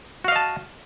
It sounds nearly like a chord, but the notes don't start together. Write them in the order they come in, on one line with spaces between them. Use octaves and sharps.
F#4 F5 D#5 A5